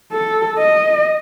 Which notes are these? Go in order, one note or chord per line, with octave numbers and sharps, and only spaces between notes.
A4
D#5